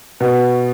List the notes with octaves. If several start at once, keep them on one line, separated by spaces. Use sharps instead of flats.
B2